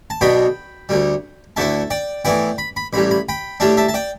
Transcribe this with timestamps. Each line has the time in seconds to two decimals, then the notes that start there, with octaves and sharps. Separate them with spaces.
0.10 A5
0.21 B1 B2 B3 D4 G5 B5
0.89 D2 D3 G3
1.56 D2 D3 A3 E4 E5 A5
1.90 D5 G5
2.25 A2 E3 B3 E4 D5 G5
2.58 B5
2.76 B5
2.93 A1 A2 G3 B5
3.11 B5
3.29 G5 B5
3.60 A2 G3 D4 E5 A5
3.77 E5 A5
3.89 A5
3.94 D5 G5